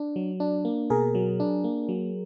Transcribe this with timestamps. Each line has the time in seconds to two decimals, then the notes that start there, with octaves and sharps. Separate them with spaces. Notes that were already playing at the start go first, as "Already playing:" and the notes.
Already playing: D4
0.16 F#3
0.40 D4
0.65 A#3
0.90 B2 G#4 A#4
1.15 F#3
1.40 D4
1.64 A#3
1.89 F#3